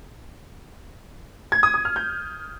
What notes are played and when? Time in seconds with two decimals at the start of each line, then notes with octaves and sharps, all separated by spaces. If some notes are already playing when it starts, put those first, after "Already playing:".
1.52 G#6
1.63 D#6
1.74 D#6
1.85 F6
1.96 G6